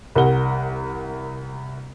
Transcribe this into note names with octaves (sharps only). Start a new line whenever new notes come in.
C2 A#4 F#5 G7